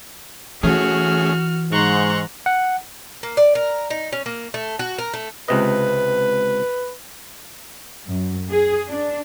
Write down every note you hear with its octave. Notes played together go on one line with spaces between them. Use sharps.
E3 A3 C#4 F#4 G#4 F6
G#2 A#5 C6 C#6 F#6
F#5
A#3
D5
A#4
D#4
C#4
A#3
A3
F#4
A#4
A3
C#2 C3 B4 D#5
F#2
G#4
D4